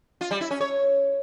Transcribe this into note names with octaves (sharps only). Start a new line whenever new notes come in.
F4
G3
E4
C#4
C#5